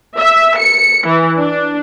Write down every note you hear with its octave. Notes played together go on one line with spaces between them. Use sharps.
E5
C#7
E3
D4